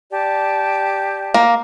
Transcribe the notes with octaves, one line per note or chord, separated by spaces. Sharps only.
G4 D5 A5
A#3